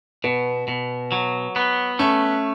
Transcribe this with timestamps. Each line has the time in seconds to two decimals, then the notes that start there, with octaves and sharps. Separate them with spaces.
0.24 B2 B3
0.68 B2
1.12 F#3
1.56 B3
1.99 A3 C#4